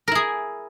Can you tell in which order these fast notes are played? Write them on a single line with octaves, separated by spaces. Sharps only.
A#4 E4 G#4